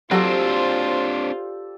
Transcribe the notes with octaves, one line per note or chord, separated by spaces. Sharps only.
F#3 C4 D4 F4 G4 A4 C5 D5